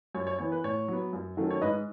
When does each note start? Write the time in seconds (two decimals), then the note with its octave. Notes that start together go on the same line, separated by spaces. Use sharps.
0.15 F#2 C#5
0.27 C#5
0.39 E3 B3 C#5
0.52 B4
0.64 A2 C#5
0.88 F#3 B3
1.13 F#2
1.37 D#3 F#3 A3 C#4
1.50 C#5
1.62 G#2 B4 D#5